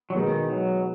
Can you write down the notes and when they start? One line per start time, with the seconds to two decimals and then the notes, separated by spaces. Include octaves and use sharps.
0.10 F#3
0.15 B2 D#3 G#3 B3 D#4
0.50 F#3